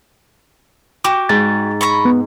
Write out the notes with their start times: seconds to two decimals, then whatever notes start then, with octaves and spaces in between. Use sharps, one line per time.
1.04 F#4 G4 D6
1.29 G#2 A6
1.81 A#5 B5 C#6
2.05 B3